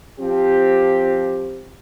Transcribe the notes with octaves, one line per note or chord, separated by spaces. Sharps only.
F3 C4 G4